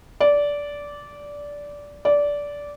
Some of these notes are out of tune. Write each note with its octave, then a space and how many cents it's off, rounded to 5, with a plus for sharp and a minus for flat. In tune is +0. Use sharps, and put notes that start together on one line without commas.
D5 -15
D5 -15